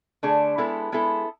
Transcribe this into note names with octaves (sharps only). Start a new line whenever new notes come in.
D3 A3 D4 G#4
G#3 B3 E4 A4
G#3 B3 E4 A4